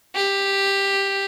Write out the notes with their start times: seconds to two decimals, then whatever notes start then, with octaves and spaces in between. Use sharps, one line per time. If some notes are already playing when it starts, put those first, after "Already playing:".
0.15 G4